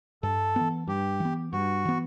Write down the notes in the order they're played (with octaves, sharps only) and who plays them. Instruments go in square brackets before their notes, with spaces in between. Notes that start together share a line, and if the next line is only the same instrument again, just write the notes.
[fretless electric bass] G2 [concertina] A4
[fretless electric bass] E3 B3
[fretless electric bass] G2 [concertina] G4
[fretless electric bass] E3 B3
[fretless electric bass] G2 [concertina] F#4
[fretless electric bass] E3 B3